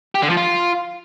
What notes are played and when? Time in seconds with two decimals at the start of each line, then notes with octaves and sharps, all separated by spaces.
0.15 G4
0.22 D3
0.30 F3
0.37 F4